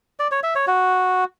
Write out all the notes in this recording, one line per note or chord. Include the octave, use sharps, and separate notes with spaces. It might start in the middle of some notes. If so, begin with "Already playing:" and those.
D5
C#5
E5
C#5
F#4